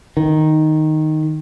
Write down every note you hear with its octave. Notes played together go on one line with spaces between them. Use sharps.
D#3